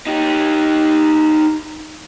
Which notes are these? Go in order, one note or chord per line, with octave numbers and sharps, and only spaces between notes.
D#4 G4